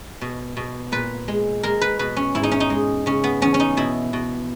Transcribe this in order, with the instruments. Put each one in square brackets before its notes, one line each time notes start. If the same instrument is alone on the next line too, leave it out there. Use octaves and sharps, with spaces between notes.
[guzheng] B2
B2
A#2 B4
G#3
G#3 A#4
B4
B2 B4
C#4
G#2 E4
D#4
C#4
D#4
G#3
C#3 C#4
B3
E2 C#4
C#4
D#4
B2 E4
B2